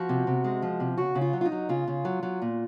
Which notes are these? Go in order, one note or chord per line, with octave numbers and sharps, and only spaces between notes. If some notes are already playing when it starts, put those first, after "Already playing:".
Already playing: F3 F#4
C3
C3
G#3
F3
C3
C#3 F#4
C#3
F4
F#3
F4
D#4
F#3
C#3 F4
C#3
F#3
F#3
A#2